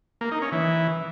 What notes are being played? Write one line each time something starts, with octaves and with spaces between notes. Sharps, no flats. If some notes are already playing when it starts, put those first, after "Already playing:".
A#3
D#4
C#4
E3